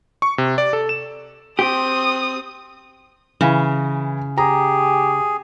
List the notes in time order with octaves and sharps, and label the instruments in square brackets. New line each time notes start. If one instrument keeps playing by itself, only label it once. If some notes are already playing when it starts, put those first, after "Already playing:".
[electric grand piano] C#6
C3
D5
A4
E7
[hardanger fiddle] C4 [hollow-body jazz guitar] G4 [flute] C6 [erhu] D#6
[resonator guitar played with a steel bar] C#3 [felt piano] E3
[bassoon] G4 [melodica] G#4 [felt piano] A#5